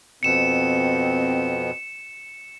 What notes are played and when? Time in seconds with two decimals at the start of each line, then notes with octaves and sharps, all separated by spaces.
0.23 F2 B2 C4 C#7 E7